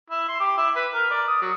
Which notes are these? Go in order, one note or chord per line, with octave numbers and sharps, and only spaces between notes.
E4
C6
G4
E4
B4
A#4
D5
D#6
F#3